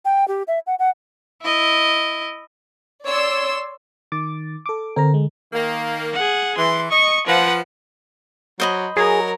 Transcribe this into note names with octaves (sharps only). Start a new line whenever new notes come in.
G5
G4
E5
F#5
F#5
E4 D#5
C#5 D5 C6 E6
D#3 D6 A6
A4 D6
D3 C4 A#4 A#5
G#3
D#3 A#3
G#4 F#5
E3 C6
D#5 C#6 C#7
F3 B4 F#5
F#3 C5 D#5 B5
F#3 G#4 A#4